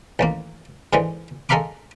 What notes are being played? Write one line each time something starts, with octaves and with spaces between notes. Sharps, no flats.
A1 D#2 A#3
G#2 D3 E3 G#3
G#3 A4 A#4 F5 B5 D6